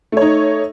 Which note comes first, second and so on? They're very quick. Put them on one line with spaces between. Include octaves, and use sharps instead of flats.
A3 C#5 D#4